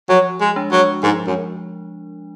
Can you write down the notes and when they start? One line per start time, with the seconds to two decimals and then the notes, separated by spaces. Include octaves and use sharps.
0.09 F3 F#3
0.41 G#3
0.56 G#3 D4
0.72 F#3
1.03 G#2 F3
1.27 F#2